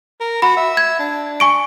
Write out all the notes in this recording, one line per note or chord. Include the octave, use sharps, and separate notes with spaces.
A#4
F#4 B5
E5
G#6
D4
G#5 C#6 D7